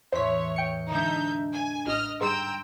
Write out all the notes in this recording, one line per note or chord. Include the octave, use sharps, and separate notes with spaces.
E2 A2 C5 C#5 B6
G5 C#7
D3 G#3 D4 D#4 E5 G6
G#5
A1 D#5 F6
G#2 G3 G5 A#5 C6 E6